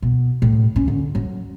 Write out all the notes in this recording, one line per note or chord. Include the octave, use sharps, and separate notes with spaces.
B2
A2
C#4
D3
F#3